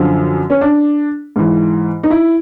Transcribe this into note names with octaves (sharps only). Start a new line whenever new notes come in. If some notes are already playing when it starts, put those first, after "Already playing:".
Already playing: F#2 D3 F3
C#4
D4
G#2 E3
D#4
E4